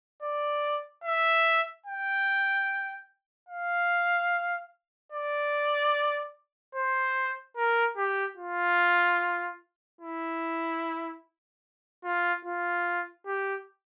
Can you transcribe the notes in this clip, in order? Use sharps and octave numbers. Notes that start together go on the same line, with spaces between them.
D5
E5
G5
F5
D5
C5
A#4
G4
F4
E4
F4
F4
G4